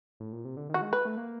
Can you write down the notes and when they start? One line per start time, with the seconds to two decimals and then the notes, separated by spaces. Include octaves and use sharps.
0.20 A2
0.32 A#2
0.45 C3
0.57 D3
0.69 D#3
0.74 F#4
0.81 G#3
0.93 B4
1.05 A3
1.17 A#3